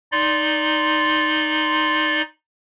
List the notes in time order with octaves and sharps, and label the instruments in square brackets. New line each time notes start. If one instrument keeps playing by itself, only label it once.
[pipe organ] D#4 D5 C6